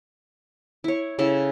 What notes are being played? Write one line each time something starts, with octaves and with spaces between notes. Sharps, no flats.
E4 C#5
C#3 E4 A4